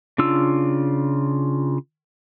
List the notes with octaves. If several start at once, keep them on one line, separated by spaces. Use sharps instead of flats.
C#3 D4 F4 E6